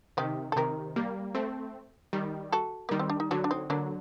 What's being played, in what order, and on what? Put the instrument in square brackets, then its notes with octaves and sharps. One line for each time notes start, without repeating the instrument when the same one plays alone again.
[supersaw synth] C3 D#3 [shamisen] D#4 G4
[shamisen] A4
[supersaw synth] C3 D#3 [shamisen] G4 A#4
[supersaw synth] G3 A#3
A3 C4
D#3 G3
[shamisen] F#4 A4
[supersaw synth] D#3 G3 [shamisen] A#3
[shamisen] C4
D4
D#4
[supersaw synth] D3 F#3 [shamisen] D4 F#4
[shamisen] D4
C4 D#4
[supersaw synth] D3 F#3 [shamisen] A#3 D4